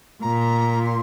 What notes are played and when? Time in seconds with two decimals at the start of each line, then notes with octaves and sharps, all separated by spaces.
0.22 A#2 A#5
0.86 C6